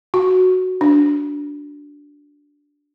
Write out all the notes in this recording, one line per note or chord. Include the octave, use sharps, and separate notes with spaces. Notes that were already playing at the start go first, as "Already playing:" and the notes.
F#4
D4